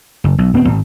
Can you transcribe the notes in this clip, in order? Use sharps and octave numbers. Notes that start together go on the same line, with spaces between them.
F#1
B1
D1 B3 C4
G#1